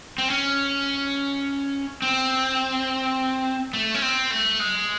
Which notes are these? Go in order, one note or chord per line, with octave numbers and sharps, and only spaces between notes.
C4
C#4
C4
A3
C#4
C4
A3
G#3